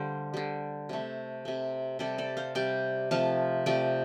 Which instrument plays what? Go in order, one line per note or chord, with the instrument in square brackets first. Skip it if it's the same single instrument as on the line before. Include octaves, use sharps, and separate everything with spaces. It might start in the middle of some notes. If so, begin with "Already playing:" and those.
Already playing: [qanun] D3 G3 C5 F5
D3 G3
C3 A3
C3 A3
C3 G3 A4 D5
A4 D5
C5 F5
C3 G3 D5 G5
C3 F3 A3 F5 A5
C3 F3 A3 D5 G5